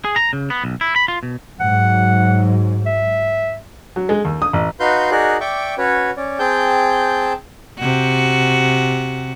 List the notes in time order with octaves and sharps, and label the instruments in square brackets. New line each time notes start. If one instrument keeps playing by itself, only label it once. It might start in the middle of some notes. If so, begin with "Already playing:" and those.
[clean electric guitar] G#4
A#5
C#3
B3
B1
E4
B5
F4
B2
[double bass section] G#2 F#3 [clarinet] F#5
[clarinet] E5
[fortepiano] F#3
G#3
D#2
D#6
A1
[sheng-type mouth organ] D#4 F#4 B4 F5 C6 G6
D#4 F#4 G#4 A#4 D5 F#6
D5 E5 G5 C#6 D6
C#4 F#4 B4 C#5
C#4 D5
C4 G#4 G5 A5 G6
[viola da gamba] C3 F#4